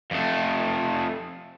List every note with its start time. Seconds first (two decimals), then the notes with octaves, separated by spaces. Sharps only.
0.11 F2 A3